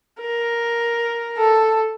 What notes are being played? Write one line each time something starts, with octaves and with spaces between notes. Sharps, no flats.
A#4
A4